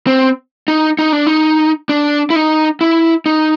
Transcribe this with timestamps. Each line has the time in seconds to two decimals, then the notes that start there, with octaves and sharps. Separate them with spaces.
0.07 C4
0.68 D#4
0.99 D#4
1.12 D4
1.27 D#4
1.89 D4
2.30 E4
2.36 D#4
2.81 E4
3.26 D#4